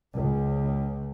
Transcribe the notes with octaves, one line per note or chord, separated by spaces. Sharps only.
C#2